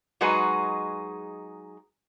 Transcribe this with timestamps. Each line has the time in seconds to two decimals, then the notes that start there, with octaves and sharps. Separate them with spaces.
0.21 F#3 G#3 D#4 F#4 G#4 B4